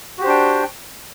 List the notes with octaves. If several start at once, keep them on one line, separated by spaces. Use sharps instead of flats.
D4 F#4 G4 C5 G5